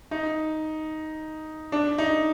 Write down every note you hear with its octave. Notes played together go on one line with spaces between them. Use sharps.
D#4
D4
D#4